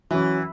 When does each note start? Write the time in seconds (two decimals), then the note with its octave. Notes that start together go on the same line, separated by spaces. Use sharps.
0.11 E3 F#3 C#4